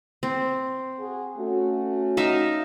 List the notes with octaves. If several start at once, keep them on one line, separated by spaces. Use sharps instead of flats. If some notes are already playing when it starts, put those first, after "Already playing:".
C4
F#4 G#4
A3 C#4 F#4
D#4 E5 F5